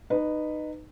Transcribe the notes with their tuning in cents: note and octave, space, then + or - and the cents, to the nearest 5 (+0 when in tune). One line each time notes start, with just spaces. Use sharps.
D#4 -20 B4 +0